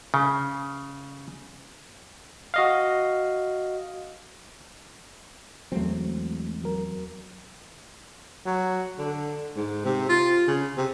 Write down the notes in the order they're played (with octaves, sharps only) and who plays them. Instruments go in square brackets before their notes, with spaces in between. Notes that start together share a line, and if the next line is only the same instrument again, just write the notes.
[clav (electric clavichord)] C#3
[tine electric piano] F#4 D#5 F5
[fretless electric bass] E2 C4 [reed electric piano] F#3 G#3 A3
[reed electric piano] F#3 A#4
[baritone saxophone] F#3
D3
G#2
C3
F4
C#3
C3